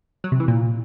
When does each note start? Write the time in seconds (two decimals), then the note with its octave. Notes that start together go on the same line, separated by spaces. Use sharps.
0.24 F#3
0.32 C3
0.40 E3
0.48 A#2